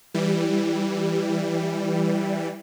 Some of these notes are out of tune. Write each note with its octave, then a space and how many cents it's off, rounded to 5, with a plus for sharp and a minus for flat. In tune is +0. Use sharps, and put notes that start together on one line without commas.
E3 +0 G3 +0